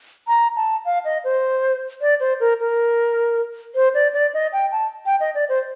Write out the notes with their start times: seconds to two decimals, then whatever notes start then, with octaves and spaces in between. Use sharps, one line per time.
0.28 A#5
0.56 A5
0.85 F5
1.05 D#5
1.24 C5
2.01 D5
2.20 C5
2.40 A#4
2.60 A#4
3.75 C5
3.94 D5
4.13 D5
4.34 D#5
4.53 G5
4.72 A5
5.06 G5
5.20 D#5
5.35 D5
5.49 C5